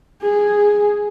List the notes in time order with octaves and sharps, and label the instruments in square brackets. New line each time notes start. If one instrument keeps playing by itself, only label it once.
[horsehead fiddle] G#4